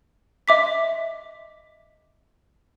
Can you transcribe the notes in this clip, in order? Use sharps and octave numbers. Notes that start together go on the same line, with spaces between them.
D#5 E5 D6 B6